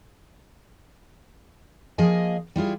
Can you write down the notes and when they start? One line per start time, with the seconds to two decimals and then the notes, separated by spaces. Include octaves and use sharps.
1.98 F3 A#3 G#4 D#5 G#5
2.56 G3 E4 F4 G#4